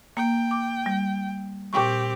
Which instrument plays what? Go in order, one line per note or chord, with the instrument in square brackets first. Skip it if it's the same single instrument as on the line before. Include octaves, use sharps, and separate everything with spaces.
[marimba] A#3 [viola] G5
[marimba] D6
G3
[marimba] A#2 G5 C#6 [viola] C4 G4